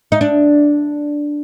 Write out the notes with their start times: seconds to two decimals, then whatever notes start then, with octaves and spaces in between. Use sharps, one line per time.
0.12 D#4
0.21 D4